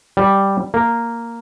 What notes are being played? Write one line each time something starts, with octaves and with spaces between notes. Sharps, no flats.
G3
A#3